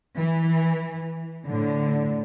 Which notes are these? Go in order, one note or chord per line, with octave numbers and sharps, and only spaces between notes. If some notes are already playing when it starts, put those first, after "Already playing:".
E3
A2 D3